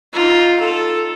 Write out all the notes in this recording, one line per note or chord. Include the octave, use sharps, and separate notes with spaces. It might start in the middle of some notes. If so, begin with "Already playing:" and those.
D#4 F4
A4